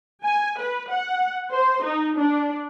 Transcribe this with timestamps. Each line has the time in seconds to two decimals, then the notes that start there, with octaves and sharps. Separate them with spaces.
0.23 G#5
0.59 B4
0.90 F#5
1.51 C5
1.85 D#4
2.16 D4